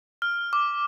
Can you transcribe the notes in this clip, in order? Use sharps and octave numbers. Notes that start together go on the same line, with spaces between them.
F6
D6